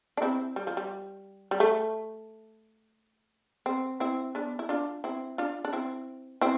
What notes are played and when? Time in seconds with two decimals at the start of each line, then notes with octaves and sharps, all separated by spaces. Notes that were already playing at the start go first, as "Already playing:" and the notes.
0.17 D4
0.22 C4 E4
0.56 G3
0.67 F3
0.77 G3
1.51 G3
1.60 A3
3.66 C4
4.00 C4 E4
4.35 B3 D4
4.59 E4
4.69 D4 F4
5.04 C4 E4
5.38 D4 F4
5.65 D4
5.73 C4 E4
6.41 C4 E4